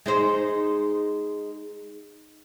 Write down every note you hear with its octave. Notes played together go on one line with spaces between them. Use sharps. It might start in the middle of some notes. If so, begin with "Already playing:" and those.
G#3 D#4 C5